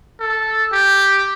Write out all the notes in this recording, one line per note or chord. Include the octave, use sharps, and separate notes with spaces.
A4
G4